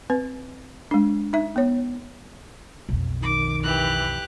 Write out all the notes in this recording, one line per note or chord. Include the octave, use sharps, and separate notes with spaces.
C4 B4
G#3 D4
D#4 E5
B3 C#5
B1 F2
D#3 D6
E3 G4 F#6